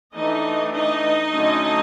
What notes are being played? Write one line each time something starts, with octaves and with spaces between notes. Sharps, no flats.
E3 A3 D4 D#4 D#5
D#4 D#5
D3 F#3 A3 C#4